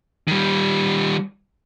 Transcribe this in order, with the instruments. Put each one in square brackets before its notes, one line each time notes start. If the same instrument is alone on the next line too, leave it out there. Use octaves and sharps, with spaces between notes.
[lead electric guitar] D#3 G3